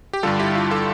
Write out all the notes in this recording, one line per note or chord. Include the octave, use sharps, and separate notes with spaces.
G4
G2 D3 G3 F4 A4
E4 G4
F4
F4 A4